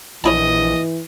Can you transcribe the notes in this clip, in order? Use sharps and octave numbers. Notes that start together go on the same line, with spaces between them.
A#1 E3 C#4 E4 D#5 A5